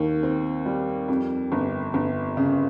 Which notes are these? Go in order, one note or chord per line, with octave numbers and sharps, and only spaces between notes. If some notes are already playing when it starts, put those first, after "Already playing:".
Already playing: D#2 D#3
C4
G3
F2
G1
G1
C#3